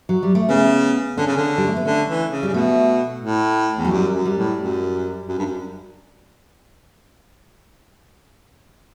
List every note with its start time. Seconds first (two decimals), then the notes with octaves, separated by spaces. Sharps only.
0.09 F#3
0.23 G3
0.35 A3
0.49 C#3 B3
1.18 D3 C#4
1.27 C#3
1.37 D3
1.58 G3
1.67 A3
1.77 B3
1.85 D3 C#4
2.09 E3
2.31 C#3
2.43 G3
2.48 C#3
2.54 B2 A3
3.22 A2
3.78 E2
3.85 F#3
3.91 F#2 G3
4.14 F#2
4.25 G3
4.37 A2
4.59 F#2
5.28 F#2
5.38 G2
5.46 F#2